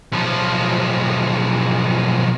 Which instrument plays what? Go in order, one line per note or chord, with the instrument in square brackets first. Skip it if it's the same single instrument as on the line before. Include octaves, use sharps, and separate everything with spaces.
[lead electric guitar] B1 F3